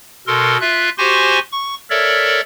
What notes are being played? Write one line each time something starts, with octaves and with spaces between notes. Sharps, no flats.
B2 A4 A#4 C6
F4 E5 F#6
F#4 G4 C5 G#5 C6 C#6
C#6
A4 A#4 C#5 D5 E5